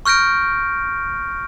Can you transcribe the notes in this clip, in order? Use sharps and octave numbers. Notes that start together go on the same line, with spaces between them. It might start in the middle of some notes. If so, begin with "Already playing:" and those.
C#6 F6 G6 A#6 D7